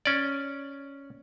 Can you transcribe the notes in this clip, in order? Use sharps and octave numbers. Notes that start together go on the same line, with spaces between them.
C#4 D5